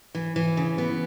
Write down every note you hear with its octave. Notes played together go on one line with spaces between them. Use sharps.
E3
E3
C#3
B3